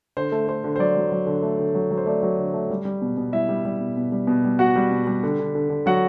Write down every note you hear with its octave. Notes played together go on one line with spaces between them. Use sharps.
D3 C5
A3
A3 C5
D3
C5
F#3 D5
F#3
F#3
D3
A3
D3
F#3
F#3
C5
A3 D5
F#3
D3
A3
G3
G3
B2
B2
G3 E4 E5
G3
G3
B2
B2
G3
B2
G3
G3 F#4 F#5
G3
B2
G3
D3
D3
D3
D3
F#3 F#4 F#5